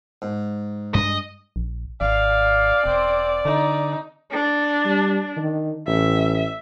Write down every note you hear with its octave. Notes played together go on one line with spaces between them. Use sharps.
G#2
G2 G#3 D4 D#5
A#1
G#1 D5 F5
E1 C4
D3 D#4
D4
G3
D#3
A1 E5